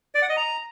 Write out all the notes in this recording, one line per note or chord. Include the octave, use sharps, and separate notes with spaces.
D5
F#5
D#5
A#5